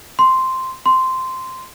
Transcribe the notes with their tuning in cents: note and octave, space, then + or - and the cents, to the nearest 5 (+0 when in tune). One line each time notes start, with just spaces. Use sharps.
C6 -5
C6 -10